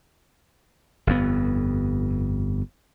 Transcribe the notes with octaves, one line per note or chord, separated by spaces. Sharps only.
G1 F2 B3